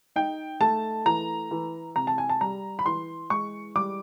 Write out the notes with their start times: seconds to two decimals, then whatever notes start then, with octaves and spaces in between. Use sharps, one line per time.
0.16 D#4 G5
0.60 A3 A5
1.06 E3 A#5
1.51 E3
1.96 C3 A#5
2.07 A5
2.18 G#5
2.29 A5
2.41 G3 A#5
2.79 B5
2.86 E3 C6
3.30 G#3 C#6
3.76 G3 D6